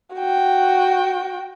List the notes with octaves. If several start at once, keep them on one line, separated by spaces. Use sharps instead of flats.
F#4 G5